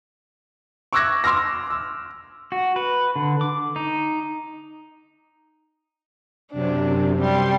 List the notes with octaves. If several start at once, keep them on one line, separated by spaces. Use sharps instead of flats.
C#6 D6 E6 F#6 G#6 A#6
C6 D6 E6 F6 A#6
E6
F#4
B4
D3
D6
D#4
F#2 C3 D4
G3 C6